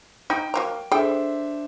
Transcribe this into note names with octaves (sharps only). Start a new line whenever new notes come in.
D#4 G5
F#3 A#3 A#5
D4 G#4 A4 C5 E5 G5